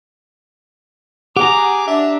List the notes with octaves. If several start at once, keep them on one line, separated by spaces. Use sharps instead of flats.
G4 G#4 F#5 A#5 D6
D4 E5